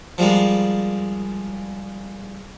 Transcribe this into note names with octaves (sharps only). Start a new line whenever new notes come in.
F3 G3 G#3 A#3